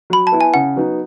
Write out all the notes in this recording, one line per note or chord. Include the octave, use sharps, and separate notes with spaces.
F#3 B5
A5
B3 E4
G#5
C#3 F#5
F#3 B3 D#4